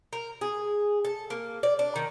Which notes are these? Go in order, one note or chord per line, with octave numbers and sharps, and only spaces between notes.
A#4
G#4
A4
A#3
D5
D4
D#3